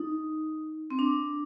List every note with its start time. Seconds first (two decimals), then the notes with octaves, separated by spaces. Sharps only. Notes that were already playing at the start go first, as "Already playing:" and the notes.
Already playing: D#4
0.90 C4
0.99 D4